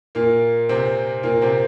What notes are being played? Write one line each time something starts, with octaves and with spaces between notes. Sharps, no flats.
A#2 A#3
C3 C4
A#2 A#3
C3 C4